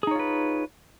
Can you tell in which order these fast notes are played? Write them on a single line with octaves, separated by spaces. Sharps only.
G#4 D#4 C#5 F4 B4